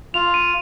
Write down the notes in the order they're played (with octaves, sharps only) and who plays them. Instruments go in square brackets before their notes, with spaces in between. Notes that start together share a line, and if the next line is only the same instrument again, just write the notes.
[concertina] F4 [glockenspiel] F7
[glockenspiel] D#7